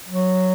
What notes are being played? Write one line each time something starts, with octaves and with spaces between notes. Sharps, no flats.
F#3